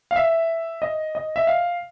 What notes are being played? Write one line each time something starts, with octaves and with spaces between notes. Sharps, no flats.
F5
E5
D#5
D#5
E5
F5